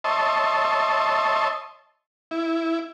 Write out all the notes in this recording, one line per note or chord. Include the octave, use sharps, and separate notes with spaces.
C#5 D#5 E5 A5 C6
E4